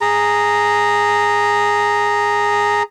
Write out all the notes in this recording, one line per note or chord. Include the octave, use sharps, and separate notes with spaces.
G#4 A#5